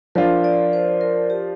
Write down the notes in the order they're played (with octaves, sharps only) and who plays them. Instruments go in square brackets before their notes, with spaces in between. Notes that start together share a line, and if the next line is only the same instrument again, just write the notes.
[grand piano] F3 D4 F4 [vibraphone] A#4
[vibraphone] D5
C5
A#4
G4